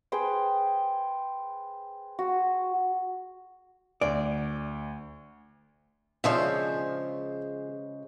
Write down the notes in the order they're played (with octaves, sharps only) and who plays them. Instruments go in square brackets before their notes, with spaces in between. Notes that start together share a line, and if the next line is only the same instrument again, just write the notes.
[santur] G#4 B4 C5 G5
F#4
[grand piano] D2 [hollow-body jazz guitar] D5
[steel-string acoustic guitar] C#3 G#3 C5 [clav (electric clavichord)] F3 F5 [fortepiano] D4 C#5 E5